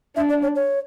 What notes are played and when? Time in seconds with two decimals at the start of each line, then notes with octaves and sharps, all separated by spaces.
0.16 D4 E5
0.29 D5
0.42 C#5
0.55 C#5